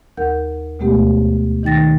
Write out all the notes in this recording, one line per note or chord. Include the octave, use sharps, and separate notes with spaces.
D#2 A#4 F#5 G6
D2 B2 G#3 A3 B3 G4
D#3 D#4 G5 A6 A#6